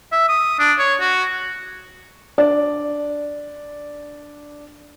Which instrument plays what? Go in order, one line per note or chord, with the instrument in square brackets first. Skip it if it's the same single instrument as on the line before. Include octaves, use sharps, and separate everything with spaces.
[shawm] E5
D#6
D4
C#5
F#4
[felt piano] D4 D5